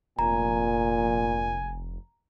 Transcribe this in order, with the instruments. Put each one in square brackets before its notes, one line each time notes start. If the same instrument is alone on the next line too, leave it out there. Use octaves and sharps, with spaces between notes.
[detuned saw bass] F1 [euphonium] A#2 [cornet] G#5 [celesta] A#5